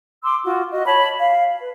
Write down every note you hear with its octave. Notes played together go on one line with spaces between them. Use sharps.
C6 D6 E6
F4 F#4
F#4 D#5
C#5 A5 B5
F5
B4